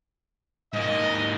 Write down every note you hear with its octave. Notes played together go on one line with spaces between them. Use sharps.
G#2 A#3 D#5